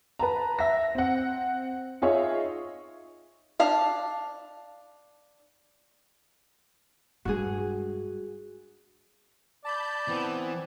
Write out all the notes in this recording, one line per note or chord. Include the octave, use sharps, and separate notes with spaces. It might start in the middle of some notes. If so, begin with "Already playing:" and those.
B4 A5 A#5
E5 A#6
C4 F#5
D#4 F4 G#4 C#5 D#5 E5
D4 F5 A5
G2 G#3 F#4 G#4
D5 A5 B5 G6
E3 B3 C4